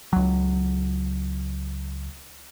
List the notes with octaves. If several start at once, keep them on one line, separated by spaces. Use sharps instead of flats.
C#2 F#3